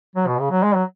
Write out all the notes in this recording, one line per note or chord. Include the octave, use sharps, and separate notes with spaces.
F#3
B2
C#3
F#3
G#3
F#3